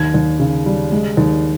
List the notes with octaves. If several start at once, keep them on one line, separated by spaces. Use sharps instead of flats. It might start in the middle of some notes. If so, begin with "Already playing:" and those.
Already playing: D#2 G#6
D#2
C#3
G3
G#3
D#2